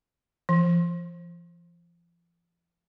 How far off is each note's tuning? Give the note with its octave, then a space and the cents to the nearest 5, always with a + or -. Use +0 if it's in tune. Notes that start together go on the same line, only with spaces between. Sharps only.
F3 -40